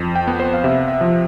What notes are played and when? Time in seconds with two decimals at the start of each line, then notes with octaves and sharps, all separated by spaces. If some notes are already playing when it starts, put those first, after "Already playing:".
Already playing: F2
0.16 G5
0.27 B3
0.40 C5
0.53 F5
0.64 C3 E5
0.88 E5
1.01 F3